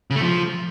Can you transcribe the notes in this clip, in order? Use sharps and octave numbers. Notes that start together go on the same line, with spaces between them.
C#3
A3
F3